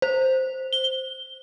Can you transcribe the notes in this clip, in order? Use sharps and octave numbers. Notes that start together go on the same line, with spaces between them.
C5
G7